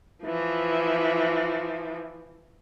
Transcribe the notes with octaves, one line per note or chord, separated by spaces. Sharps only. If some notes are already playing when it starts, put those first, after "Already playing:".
E3 F3